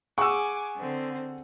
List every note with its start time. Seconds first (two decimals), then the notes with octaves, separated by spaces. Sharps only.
0.18 G#4 F#5 G#5 C#6 D6 E6
0.76 D3 C4